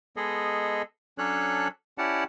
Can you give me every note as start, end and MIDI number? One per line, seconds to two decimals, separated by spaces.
0.16 0.82 56
0.16 0.82 59
0.16 0.82 68
0.16 0.82 69
0.16 0.82 75
1.18 1.68 54
1.18 1.68 61
1.18 1.68 62
1.18 1.68 69
1.18 1.68 73
1.18 1.68 90
1.98 2.24 61
1.98 2.24 64
1.98 2.24 67
1.98 2.24 74
1.98 2.24 78
1.98 2.24 81